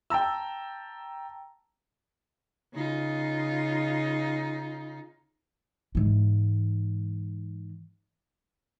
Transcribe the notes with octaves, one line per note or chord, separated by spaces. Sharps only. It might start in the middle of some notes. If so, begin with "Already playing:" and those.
G5 A5 A#5 E6
C#3 D#4 F4
G#2 E3